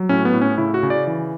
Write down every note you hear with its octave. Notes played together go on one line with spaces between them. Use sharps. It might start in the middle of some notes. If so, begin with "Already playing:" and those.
Already playing: F#3
A2 C#4
B3
A2
C#4
C#3 E4
F#4
C#3
D5
E3